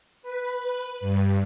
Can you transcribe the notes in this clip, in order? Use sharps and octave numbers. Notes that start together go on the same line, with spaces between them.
B4
G2